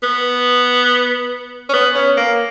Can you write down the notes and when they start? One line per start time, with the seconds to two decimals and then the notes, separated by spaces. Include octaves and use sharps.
0.03 B3
1.69 C#4
1.74 B3
1.95 C#4
2.17 A#3